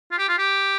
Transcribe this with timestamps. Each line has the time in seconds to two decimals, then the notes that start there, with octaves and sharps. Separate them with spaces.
0.11 F4
0.18 G4
0.28 F4
0.38 G4